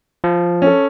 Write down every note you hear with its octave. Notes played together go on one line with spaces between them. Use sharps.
F3
C#4 A4